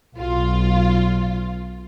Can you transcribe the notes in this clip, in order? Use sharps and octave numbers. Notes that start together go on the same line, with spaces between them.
B1 F4